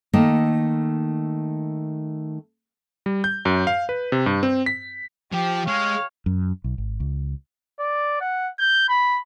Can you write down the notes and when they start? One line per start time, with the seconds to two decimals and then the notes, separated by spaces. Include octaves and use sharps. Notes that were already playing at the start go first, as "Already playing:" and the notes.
0.13 D#3 A3 A#3
3.06 G3
3.24 G6
3.45 F#2
3.67 F5
3.89 B4
4.12 C3
4.26 G2
4.43 C4
4.66 B6
5.32 F3 G4
5.67 G#3 C#5 F5
6.26 F#2
6.64 B1
6.78 G#1
7.00 C#2
7.80 D5
8.21 F#5
8.59 G6
8.89 B5